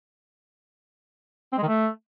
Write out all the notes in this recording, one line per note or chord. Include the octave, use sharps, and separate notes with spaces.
C4
G#3
D#3
A3